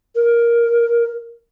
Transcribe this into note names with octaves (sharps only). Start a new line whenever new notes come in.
A#4